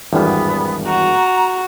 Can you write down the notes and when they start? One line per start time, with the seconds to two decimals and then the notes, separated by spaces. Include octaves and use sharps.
0.13 G#1 E2 G2 B3
0.86 F#4 A#5